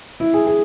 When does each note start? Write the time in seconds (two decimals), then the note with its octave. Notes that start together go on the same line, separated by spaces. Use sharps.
0.20 E4
0.34 G#4
0.47 G#4